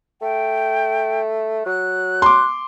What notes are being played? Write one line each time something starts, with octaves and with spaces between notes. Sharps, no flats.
A3 G5
F#3 F#6
C6 D6